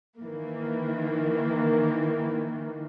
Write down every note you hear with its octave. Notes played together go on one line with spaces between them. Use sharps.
D#3 E3 A#3